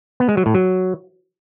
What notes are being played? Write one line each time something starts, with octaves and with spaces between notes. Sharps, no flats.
B3
G#3
F#3
A2
F#3